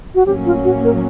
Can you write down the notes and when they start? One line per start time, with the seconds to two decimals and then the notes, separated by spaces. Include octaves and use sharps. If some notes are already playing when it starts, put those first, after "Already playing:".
0.15 F#4
0.26 A2 F#3 A#3 C#4 G4
0.46 F4
0.65 F#4
0.84 A#4